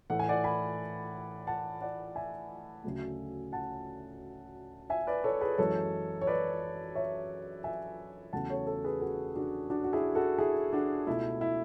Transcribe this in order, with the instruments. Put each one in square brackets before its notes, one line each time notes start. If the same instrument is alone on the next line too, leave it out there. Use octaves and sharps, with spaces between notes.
[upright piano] A2 E3 A3 F#5
G#5
D5 F#5
G#5 B5
F#5 A5
D5 F#5
E5 G#5
D2 C#3 F#3 A3
F#5 A5
E5 G#5
B4 D5
A4 C#5
G#4 B4
F#2 E3 G#3 A4 C#5
C#5
B4 D5
C#5 E5
E5 G#5
E2 C#3 F#3 A3 F#5 A5
A4 C#5
A4 C#5
G#4 B4
F#4 A4
D4 F#4
D4 F#4
F#4
E4 G#4
F#4 A4
E4 G#4
D4 F#4
C#2 B2 A3 E4
E4